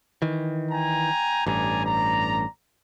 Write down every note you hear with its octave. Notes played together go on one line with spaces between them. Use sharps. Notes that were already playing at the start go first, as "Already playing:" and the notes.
D#3 E3
G5 G#5 A#5
A1 G2 D5 G#5 A#5
D5 A#5